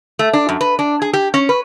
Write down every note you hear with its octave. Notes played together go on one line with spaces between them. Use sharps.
A3
D4
F#2
B4
D4
G#4
G4
C#4
B4